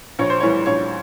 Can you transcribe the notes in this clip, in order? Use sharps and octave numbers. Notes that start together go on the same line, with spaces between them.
A#1 C#5
C5
A2 E3 G3 C#5
A#1 C#5